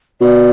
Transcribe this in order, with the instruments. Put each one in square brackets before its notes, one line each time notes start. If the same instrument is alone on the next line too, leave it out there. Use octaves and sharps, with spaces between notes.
[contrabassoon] B2 [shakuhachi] D5